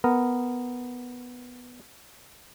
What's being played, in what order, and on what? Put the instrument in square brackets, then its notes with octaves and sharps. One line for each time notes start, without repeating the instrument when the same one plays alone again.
[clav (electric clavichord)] B3 A#4